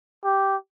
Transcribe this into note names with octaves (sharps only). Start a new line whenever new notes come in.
G4